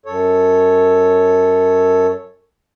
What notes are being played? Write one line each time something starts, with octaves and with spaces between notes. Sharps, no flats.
F#2 A4 C#5